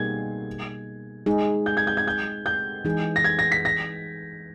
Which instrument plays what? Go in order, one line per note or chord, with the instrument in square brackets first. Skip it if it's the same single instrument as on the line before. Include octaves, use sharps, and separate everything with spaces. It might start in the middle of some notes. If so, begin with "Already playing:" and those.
Already playing: [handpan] B2 G3 A#3 D#4 G#4 [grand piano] G#6
[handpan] G#3 D#4 G#4
[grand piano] G6
G#6
G6
G#6
G6
G6
[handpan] E3 G#3 D#4 G#4
[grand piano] A#6
G#6
A#6
B6
A#6